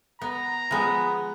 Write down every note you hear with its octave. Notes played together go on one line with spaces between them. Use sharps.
B3 A#5
F3 G#3 B3